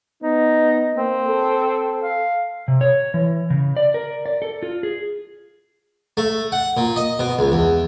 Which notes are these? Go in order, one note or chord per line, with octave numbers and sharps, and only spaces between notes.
B3 D#4
A#3 C4
A4
F5
C3
C#5
E3
C#3
D5
A#4
D5
A4
F4
G#4
A3
F#5
A#2
D#5
B2
C#2
E2